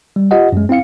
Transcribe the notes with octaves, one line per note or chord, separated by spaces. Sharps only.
G3
F4 G4 D#5 F#5
F#2 G#3
C4 E4 F5 C#7